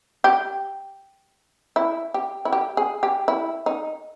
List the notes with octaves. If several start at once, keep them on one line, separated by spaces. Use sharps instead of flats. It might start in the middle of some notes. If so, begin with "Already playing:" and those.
G4
E4
G4
E4
G4
G#4
G4
E4
D#4